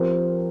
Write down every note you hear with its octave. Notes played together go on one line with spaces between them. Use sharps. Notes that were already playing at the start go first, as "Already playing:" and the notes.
Already playing: F3 C4 G4 A#4